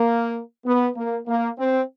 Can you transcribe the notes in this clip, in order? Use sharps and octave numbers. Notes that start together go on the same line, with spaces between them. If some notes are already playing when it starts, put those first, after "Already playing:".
Already playing: A#3
B3
A#3
A#3
C4